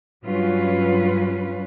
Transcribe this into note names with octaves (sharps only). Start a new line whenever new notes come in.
G2 F#3 C#4 F4 B4